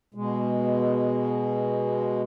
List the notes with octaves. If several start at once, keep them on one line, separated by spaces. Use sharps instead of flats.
B2 G#3